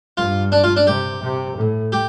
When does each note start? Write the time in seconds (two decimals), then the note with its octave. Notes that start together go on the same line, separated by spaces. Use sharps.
0.17 G2 F4
0.52 D4
0.64 F4
0.76 D4
0.87 C3 G4
1.22 C3
1.57 A2
1.92 G4